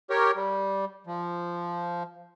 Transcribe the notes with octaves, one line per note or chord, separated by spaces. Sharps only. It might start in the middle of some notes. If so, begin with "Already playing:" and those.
G4 A#4 C#5
G3
F3